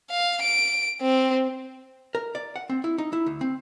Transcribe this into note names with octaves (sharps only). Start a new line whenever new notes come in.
F5
D7
C4
A#4
D5
F#5
C4
E4
D#4
E4
D2
C4